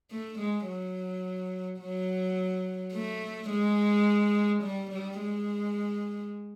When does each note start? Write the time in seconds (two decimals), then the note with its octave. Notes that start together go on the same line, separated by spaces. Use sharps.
0.10 A3
0.39 G#3
0.67 F#3
1.80 F#3
2.93 A3
3.50 G#3
4.63 G3
4.91 G3
5.20 G#3